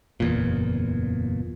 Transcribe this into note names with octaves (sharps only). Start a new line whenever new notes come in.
F#1 E2 A#2